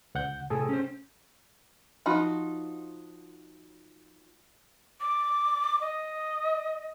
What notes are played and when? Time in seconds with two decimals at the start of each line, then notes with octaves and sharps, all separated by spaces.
0.15 C#2 F#5 G6
0.50 A2 C3 G#4 A4
0.69 C#4 C5
2.06 F3 D#4 F4 F#4 B5
5.00 D6
5.81 D#5